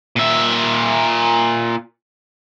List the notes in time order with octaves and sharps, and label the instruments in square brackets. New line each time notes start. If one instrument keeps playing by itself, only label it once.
[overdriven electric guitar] A#2 E5